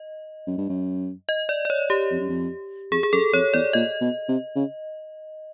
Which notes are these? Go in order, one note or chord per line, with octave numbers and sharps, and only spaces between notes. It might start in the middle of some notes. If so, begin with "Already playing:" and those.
Already playing: D#5
F#2
G2
F#2
D#5
D5
D5
C#5
G4
F2
F#2
F2
F2 G#4
G#4
F#2 A4
F2 C#5
E2 D5
A#2 D#5
B2
C3
C#3